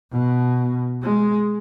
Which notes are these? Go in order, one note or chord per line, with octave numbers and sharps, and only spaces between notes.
B2
G#3